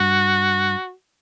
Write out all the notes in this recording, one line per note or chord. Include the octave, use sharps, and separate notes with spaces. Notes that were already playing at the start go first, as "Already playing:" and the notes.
Already playing: G2 F#4